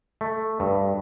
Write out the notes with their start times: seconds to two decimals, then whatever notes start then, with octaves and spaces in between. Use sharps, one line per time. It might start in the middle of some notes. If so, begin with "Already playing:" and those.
0.21 A3
0.60 G2